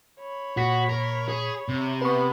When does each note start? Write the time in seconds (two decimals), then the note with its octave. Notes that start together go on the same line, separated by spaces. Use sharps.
0.20 C#5 B5
0.57 A#2 F#4 B6
0.89 A#4
1.28 G#4
1.69 C3
2.01 B3 B4 B5 C#6